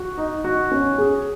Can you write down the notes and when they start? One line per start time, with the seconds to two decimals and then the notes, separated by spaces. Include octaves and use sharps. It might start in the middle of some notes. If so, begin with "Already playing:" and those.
Already playing: F#4
0.17 D#4
0.44 F#4
0.72 C#4
0.98 G#4